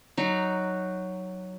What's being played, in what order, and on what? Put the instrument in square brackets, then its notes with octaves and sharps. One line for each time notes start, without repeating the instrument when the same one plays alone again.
[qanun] F#3 D#4 F#4